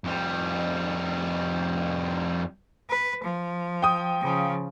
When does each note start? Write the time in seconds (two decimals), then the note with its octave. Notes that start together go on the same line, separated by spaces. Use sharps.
0.04 F2 G3
2.90 B4
3.23 F3
3.82 G5 D#6
4.22 C#3 F3